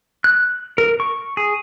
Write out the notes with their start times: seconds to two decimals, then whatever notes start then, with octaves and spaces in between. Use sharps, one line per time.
0.24 F#6
0.78 A#4
1.00 C#6
1.37 G#4